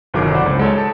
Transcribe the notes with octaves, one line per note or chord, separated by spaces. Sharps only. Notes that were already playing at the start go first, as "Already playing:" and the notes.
G1 C2 D#3 F#3 A4 D6
C5 D5 F#5 B5
C#2
G#3 A4 C#5
A5